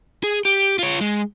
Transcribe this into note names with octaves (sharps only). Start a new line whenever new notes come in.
G#4
G4
F4 C#5
G#3